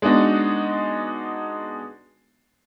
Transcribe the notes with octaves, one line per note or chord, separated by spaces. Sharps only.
G#3 B3 D4 D#4 F#4